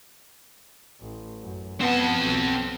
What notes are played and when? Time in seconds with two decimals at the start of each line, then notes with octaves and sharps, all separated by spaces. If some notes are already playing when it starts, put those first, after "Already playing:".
1.01 A1
1.42 F#2
1.81 B3 C4 A5
2.18 B1